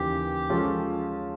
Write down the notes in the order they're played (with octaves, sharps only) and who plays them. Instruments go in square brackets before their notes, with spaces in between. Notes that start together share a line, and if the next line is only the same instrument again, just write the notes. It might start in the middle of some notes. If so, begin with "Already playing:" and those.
Already playing: [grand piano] D#2 C#3 E3 [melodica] G4
[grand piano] F3 G#3 C#4 F4 A4